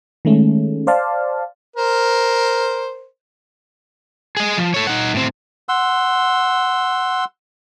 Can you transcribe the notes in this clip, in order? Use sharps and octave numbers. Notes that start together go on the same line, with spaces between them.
D#3 G#3 A3 C#4
C5 D5 F5 A5
A#4 C5
G#4 D#5
F3
A4 C#5
D#4 F#5
A2 C4
F#5 C6 E6